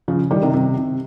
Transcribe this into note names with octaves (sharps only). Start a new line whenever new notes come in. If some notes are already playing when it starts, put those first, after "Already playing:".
C#3 F3
D#3 G3
C3 D#3
C3
C3